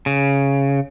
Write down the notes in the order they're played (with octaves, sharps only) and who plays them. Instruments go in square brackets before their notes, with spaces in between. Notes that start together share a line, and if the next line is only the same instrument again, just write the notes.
[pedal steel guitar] C#3